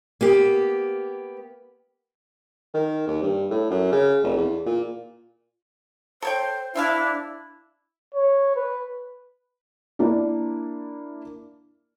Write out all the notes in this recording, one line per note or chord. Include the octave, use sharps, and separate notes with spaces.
A#3 B3 G4
D#3
D#2
G2
A2
F#2
C#3
F1
E2
A#2
A4 C5 C#5 G5
D4 E4 C5 E5 F5
C#5
B4
A#3 D4 E4 D5